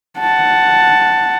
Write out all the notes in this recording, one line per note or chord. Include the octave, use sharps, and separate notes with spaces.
F#5 A5